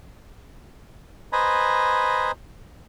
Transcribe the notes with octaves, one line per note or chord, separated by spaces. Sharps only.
B4 C5 D#5 G#5 A#5 B5